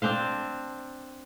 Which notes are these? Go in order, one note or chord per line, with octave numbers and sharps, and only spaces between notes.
C4 D4 C5 F5